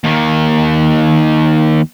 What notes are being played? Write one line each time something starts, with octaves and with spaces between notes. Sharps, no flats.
D#2 D#3